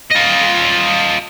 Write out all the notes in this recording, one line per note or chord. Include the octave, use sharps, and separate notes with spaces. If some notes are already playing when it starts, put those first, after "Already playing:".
F4 D#5